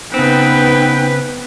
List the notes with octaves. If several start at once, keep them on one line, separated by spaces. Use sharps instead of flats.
C#3 B3 C4 D#4 B4 G5